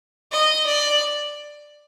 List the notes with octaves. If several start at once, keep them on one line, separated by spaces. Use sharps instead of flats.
D#5
D5